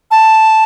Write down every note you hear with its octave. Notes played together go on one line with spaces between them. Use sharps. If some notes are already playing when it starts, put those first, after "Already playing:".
A5